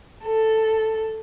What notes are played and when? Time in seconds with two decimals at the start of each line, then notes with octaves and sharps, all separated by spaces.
0.23 A4